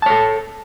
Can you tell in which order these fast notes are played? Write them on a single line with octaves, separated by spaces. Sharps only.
A5 C#5 A4